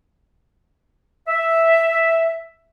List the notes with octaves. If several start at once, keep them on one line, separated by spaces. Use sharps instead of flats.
E5